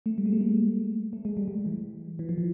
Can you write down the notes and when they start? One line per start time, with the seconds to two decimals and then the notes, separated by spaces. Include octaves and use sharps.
0.06 A3
0.18 G3
0.26 G#3
0.32 A3
0.41 A#3
1.13 A3
1.25 G#3
1.37 G3
1.48 G3
1.66 E3
2.19 E3
2.29 F3
2.38 E3